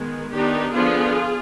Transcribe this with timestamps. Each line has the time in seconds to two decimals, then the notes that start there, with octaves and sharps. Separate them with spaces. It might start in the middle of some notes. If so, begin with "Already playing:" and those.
Already playing: D#3 G#3 B3
0.31 D#3 B3 D4 D#4 G4
0.72 D3 F3 B3 D4 F4 G#4